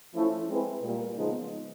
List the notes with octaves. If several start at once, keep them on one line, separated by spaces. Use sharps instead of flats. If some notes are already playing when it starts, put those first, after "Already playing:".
F3 A3 C#4 E4
G#3 C4 E4 G#4 B4
A#2 G3 A#3
C#3 F3 G#3 B3 D#4